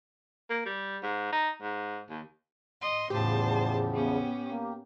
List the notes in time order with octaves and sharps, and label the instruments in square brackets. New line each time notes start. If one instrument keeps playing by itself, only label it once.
[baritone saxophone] A#3
G3
G#2
D#4
G#2
D#2
[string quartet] D#5 C6
[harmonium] E2 C#3 F3 [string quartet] A2 C5 A5 [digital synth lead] G4
[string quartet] B3 C#4
[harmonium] A#3